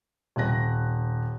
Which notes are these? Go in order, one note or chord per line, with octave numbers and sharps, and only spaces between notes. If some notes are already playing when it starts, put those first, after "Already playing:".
D#1 C4 F#6 A#6